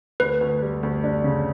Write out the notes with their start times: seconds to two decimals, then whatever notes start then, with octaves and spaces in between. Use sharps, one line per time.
0.20 D2 B4
0.41 D2
0.62 G3
0.83 D2
1.04 D4
1.24 C#3